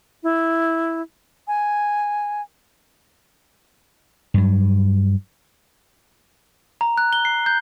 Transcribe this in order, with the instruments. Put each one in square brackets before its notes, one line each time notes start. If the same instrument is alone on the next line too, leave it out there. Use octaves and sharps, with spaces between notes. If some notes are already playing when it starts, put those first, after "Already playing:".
[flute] E4
G#5
[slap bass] G2 F#3
[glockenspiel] A#5
F#6
G7
C7
G6